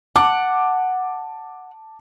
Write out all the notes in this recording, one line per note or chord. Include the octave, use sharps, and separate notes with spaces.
F#5 A5 D6